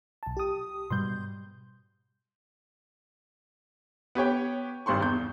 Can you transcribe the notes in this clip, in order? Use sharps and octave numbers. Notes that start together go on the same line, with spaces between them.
B1 A5
G4 D#6
G#2 B2 G3 C6 G6
B3 G4 C#5 G5
G#1 G2 C5 C6 C#6
E2 G6